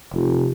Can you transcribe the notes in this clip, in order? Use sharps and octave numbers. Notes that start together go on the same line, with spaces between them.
F1